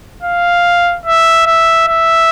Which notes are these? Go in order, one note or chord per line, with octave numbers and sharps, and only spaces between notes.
F5
E5
E5
E5